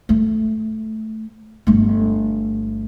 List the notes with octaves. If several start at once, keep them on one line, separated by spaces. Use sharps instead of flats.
A3
G1 A3